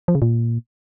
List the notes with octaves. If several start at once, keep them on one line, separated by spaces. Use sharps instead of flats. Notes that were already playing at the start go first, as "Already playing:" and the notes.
F3
C#3
A#2